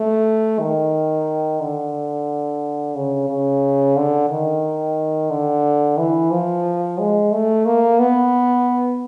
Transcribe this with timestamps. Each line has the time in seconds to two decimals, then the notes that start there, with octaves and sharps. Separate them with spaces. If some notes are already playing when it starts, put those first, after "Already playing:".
Already playing: A3
0.60 D#3
1.61 D3
2.95 C#3
3.29 C#3
3.96 D3
4.30 D#3
5.30 D3
5.98 E3
6.31 F3
6.99 G#3
7.32 A3
7.66 A#3
7.99 B3